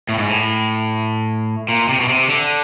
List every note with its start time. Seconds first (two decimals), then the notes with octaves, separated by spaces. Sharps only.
0.09 A2
0.18 G#2
0.28 A2
1.69 A#2
1.89 C3
2.00 B2
2.09 C3
2.29 D3